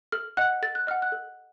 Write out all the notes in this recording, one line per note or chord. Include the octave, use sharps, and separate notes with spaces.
A4 F6
D#5 F#5 F#6
A4 A6
F#6
D#5 F#5 F6
F#6
A4